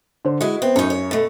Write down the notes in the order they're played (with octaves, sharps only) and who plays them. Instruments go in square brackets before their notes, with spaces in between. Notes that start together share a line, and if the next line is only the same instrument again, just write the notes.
[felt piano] D3 C5
[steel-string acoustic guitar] G#3 E4 [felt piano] F#4 D#5
[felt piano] B3 [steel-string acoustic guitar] C4
[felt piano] F#2 [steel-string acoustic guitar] D#4 C#5
[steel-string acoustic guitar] C#5
B2 A3